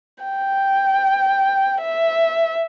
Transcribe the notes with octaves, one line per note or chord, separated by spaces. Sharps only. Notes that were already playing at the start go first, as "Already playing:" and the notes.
G5
E5